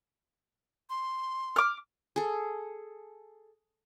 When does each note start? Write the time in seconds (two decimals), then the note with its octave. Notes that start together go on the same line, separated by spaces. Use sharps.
0.90 C6
1.56 D6 F6
2.16 G#4 A4